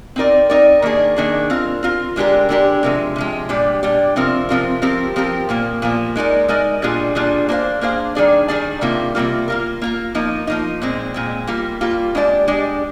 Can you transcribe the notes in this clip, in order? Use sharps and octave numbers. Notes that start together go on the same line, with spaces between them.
C4 D#4 A#4 D5
C4 D#4 A#4 D5
D#3 A#3 D4 G#4
D#3 A#3 D4 G#4
C4 F4 A#4
C4 F4 A#4
D3 G#3 D4 G4 A#4
D3 G#3 D4 G4 A#4
C3 F3 G#3
C3 F3 G#3
A#2 G3 D4 G4 D5
A#2 G3 D4 G4 D5
C3 F3 C4 F4 A#4
C3 F3 C4 F4 A#4
F3 C4 G4 A#4
F3 C4 G4 A#4
A#2 F3 A#3
A#2 F3 A#3
G#3 D#4 A#4 D5
G#3 D#4 A#4 D5
A#2 G3 D4 F4 G#4
A#2 G3 D4 F4 G#4
A#3 D4 G#4 C5 F5
A#3 D4 G#4 C5 F5
D#3 G3 D4 G#4 D5
D#3 G3 D4 G#4 D5
C3 D#3 G3 A#3 F4
C3 D#3 G3 A#3 F4
A#3 F4 A#4
A#3 F4 A#4
F3 A#3 D#4
F3 A#3 D#4
A#2 G#3 C4
A#2 G#3 C4
G3 A#3 F4
G3 A#3 F4
G#3 D4 G4 D5
G#3 D4 G4 D5